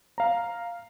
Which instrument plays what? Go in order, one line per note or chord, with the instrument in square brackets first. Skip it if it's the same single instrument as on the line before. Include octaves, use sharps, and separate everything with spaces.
[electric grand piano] F5 A#5